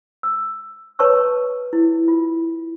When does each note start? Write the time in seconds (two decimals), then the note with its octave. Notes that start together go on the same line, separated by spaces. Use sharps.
0.23 E6
0.99 B4 C#5 A5 C#6 E6
1.73 E4
2.08 F4